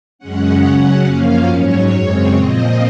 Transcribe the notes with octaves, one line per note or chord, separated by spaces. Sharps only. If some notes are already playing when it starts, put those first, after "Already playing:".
F#2 C#3 G#3 C#4 F#5
C#3 F#3 C#4
F#2 F3 A#3 C#4 F5
G#2 F#3 C#4 C#5
F#2 C#3 G#3 C4
A#2 F3 C4 D#5